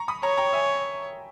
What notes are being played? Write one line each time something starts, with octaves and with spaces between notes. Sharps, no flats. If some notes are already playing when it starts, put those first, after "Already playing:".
Already playing: A#5 C#6
B5 D#6
C#5 A#5 C#6
G5 A#5
E5 G#5